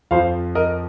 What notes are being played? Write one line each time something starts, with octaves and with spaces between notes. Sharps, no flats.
F2 F3 C5 F5
A#4 D#5